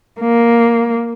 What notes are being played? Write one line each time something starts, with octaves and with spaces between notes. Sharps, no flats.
A#3